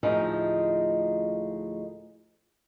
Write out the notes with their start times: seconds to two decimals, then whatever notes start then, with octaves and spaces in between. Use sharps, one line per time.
0.03 D2 A2 F3 G#3 D#4